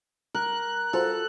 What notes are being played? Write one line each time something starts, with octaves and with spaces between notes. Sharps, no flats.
A#4 F#6
F4 F#4 A4 C5